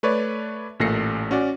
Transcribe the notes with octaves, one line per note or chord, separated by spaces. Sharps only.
A3 B4 C#5 D5
A1 A#2 A3 A#6 C7 C#7
C#4 F#4 D5